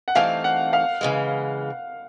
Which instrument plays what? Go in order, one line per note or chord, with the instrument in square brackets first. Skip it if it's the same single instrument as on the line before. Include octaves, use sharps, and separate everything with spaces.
[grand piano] F#5
[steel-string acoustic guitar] G2 E3 A3 C4 D#4 [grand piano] F5
[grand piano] F#5
F5
[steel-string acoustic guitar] C#3 E3 G#3